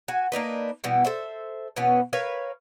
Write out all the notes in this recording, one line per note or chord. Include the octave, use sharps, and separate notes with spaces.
F#4 G#5
A#3 D4 D#4 B4
B2 E3 G3 B3
A4 C5 E5
B2 E3 B3 C#4
A#4 B4 C#5 F5